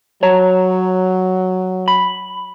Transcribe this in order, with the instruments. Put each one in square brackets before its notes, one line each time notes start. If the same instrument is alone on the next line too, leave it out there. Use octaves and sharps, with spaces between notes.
[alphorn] F#3 [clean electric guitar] C#5 A5 A#5
[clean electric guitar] B5